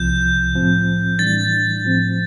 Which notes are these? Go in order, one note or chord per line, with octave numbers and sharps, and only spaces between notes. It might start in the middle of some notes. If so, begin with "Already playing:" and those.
Already playing: C2 C3 F3 G6
A2 F3 C4
A2 E3 G3 D4 A6
A2 F3 C4